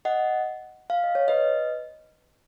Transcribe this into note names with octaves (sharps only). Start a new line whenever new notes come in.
D#5 F#5
F5
D#5
C#5
B4 D#5